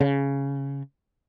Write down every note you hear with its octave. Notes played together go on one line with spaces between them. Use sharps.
C#3